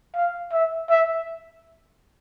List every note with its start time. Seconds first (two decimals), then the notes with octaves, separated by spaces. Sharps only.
0.15 F5
0.53 E5
0.89 E5